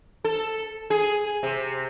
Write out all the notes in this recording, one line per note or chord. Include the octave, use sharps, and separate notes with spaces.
A4
G#4
C3